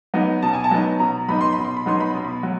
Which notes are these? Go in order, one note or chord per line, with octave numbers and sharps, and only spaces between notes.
F#3 B3 D#4
B2 A5
G#5
A5
F#3 B3 D#4
B2 A#5
F#3 B3 D#4 B5
C6
B2 B5
C6
B5
F#3 B3 D#4 C6
B5
B2 C6
B5
F#3